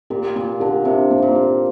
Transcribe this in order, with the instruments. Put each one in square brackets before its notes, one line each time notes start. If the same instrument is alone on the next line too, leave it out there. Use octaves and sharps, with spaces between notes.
[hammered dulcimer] A#2 [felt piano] G4
[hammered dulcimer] A#2 [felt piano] A#3
[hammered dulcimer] D3 [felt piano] G4
[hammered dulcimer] C3 [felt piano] G4
[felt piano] A#3
[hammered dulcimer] A#2
[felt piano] G4